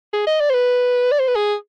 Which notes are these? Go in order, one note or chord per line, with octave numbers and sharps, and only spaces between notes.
G#4
D#5
D5
C5
B4
D5
C5
B4
G#4